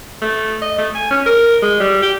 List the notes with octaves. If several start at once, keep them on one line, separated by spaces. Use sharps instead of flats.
A3
D#5
A3
G#5
C#4
A#4
G#3
G3
G4